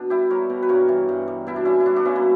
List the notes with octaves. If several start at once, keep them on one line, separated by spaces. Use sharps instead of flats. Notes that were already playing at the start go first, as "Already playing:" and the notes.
Already playing: B2 D4
G3 E4 G4
G3 A#4 C#5
B2
B4
G2 A#4 C#5
E3
G2
G3
B2 E4
D4
G3 C#4 E4
E4
G3 D4 F#4
D4 F#4
B2 C#4 E4
A#3